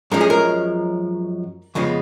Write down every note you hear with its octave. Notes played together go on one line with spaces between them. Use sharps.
F#2 F3 G#3 C#4 A#4
G#4
A#4
F2 C#3 G#3 B3